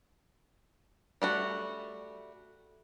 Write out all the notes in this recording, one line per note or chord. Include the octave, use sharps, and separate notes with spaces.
G3 A3 F#4